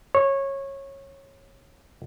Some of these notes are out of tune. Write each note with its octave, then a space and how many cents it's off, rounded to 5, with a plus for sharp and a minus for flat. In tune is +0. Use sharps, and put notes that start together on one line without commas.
C#5 -15